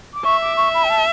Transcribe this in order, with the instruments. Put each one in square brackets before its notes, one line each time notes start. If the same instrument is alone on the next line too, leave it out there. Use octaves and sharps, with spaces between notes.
[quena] D6
[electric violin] E5 [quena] C#6
[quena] D6
C#6
B5
G5
A5